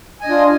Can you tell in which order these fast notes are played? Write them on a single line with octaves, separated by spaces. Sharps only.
G#5 D#5 D4 F4